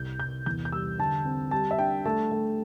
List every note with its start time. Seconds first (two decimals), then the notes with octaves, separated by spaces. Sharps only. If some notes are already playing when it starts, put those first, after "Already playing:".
Already playing: C2 G6
0.20 C2 G6
0.46 E2 G6
0.65 G6
0.72 G3 E6
0.98 D3 A5
1.25 C4
1.51 G3 A5
1.71 E5
1.79 D4 G5
2.05 A3 A5
2.31 A3